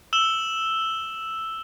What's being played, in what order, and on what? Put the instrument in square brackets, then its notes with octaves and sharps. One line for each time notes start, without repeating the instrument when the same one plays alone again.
[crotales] E6 E7 G7